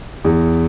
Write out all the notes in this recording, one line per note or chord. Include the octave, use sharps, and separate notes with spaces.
E2